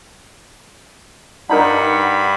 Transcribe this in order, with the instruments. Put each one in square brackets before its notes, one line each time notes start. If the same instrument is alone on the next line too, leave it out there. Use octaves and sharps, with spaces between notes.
[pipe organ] G2 B5 [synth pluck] D4 D#4 A#4 [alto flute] F#5